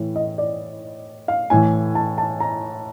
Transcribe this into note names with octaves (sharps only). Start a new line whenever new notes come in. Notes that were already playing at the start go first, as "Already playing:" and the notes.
Already playing: A2 E3
D#5
D5
F5
A2 E3 G#5
A5
A5
A#5